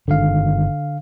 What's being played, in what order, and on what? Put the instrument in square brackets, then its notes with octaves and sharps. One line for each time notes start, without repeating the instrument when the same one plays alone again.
[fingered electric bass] G1 D#3 [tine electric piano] D3 F5